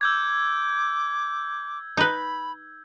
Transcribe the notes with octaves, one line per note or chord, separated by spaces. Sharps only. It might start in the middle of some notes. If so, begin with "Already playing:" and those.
D6 E6 G6 G#6
D#4 B4 B5